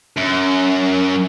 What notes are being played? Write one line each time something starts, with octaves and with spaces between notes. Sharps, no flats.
F#2